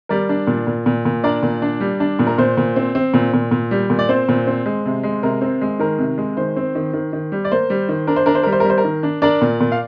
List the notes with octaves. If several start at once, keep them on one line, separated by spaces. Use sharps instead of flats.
G3 A#4 D5
D4
A#2
A#2
A#2
A#2
D4 A#4 D5
A#2
D4
G3
D4
A#2
A#4
A#2 C5
A#2
C4
C4
A#2
A#2
A#2
G3
A#2
D5
C4 C5
A#2
C4
G#3
C3
G#3
C3 A#4
C4
G#3
D#3 A#4
C3
G#3
D#3 C5
C4
D#3
D#3
D#3
G3
D5
A#3 C5
G3
D#3
D4 A#4
C5
D4 A#4
C5
G3 A#4
C5
A#4
G3
C5
A#4
D#3
D4
D4 A#4 D5
A#2
A#2
F5